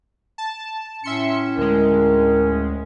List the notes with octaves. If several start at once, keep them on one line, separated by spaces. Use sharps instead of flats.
A5
A2 C#4 E5 C6 C#7
D2 G#3 A#4